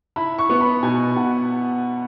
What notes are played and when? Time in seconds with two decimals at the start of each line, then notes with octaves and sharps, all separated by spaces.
0.16 E4 B5
0.38 C#6
0.49 B3
0.61 B5
0.83 B2 G#5
1.16 B2 F#5